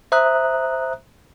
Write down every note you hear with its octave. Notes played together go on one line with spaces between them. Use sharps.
C5 E5 A#5 D#6 F#6